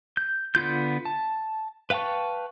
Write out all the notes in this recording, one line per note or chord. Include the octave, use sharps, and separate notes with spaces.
G6
D3 B3 F4 G6
A5
B4 F5 G5 A5 C#6